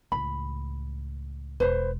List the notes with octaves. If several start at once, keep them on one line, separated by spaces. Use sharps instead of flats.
C#2 A2 B5
E1 B4 C5